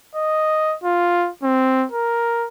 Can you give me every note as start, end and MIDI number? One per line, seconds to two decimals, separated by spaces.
0.15 0.76 75
0.84 1.30 65
1.43 1.86 60
1.92 2.48 70